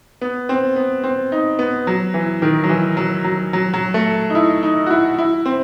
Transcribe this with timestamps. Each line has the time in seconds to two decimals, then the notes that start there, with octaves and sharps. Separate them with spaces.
0.21 B3
0.49 C4
0.76 B3
1.04 C4
1.32 D#4
1.59 B3
1.87 F#3
2.14 E3
2.42 D#3
2.64 F#3
2.69 E3
2.97 F#3
3.24 F#3
3.53 F#3
3.74 F#3
3.94 A3
4.30 D#4
4.35 E4
4.63 D#4
4.86 F#4
4.90 E4
5.18 E4
5.46 C4